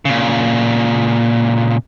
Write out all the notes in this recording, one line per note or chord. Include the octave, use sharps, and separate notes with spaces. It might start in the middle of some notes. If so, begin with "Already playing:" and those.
A#2 C#3